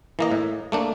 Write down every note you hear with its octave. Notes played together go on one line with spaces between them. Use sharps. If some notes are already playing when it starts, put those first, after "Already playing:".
E3 A#3 D#5
A2
A3 A#3 D4